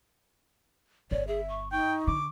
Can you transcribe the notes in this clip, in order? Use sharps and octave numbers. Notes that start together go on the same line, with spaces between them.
G1 C#5 D5
G#4 E5
C#6
D#4 G5 C#6
D3 D6